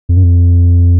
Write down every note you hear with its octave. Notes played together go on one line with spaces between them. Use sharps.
F2
F#2
F2